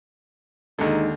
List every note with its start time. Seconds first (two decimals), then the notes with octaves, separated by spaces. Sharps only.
0.79 D#2 D3 G#3 D#4